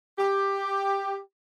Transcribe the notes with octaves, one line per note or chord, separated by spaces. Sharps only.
G4